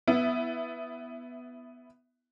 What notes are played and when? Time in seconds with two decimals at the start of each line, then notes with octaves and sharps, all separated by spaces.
0.08 B3 E4